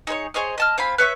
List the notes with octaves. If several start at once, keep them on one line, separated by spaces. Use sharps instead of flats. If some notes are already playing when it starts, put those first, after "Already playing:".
D#4 G#4 C5 C#5
G#4 C5 C#5 D#5
D#5 A5 F6
C4 F4 G#5 B5
B4 C#5 E5 C#6